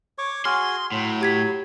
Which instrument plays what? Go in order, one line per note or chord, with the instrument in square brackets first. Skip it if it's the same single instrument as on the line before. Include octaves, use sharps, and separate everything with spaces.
[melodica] C#5 C#6 D6
[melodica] F#4 G#4 G#5 [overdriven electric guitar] C6 [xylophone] F6
[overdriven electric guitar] A2 [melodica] F#3
[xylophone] G4 G#6 B6